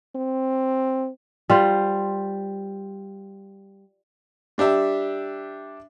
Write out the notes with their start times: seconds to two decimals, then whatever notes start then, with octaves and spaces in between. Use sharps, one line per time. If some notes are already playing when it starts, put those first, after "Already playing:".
0.15 C4
1.50 G3 F4 C5
4.58 G3 D4 G4 E5